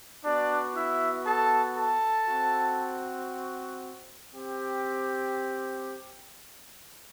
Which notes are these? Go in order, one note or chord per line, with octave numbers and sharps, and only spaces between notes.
B3 D4 F#4 D5
E4 E5
A4 A5
A4 A5
C4 F#4
C4 G4